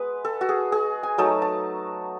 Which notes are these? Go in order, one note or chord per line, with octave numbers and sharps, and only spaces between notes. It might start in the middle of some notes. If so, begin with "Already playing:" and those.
Already playing: G#3 B3 B4
A4
F#4
G#4
G#4
G#5
F#3 A3 D#4 A5
A5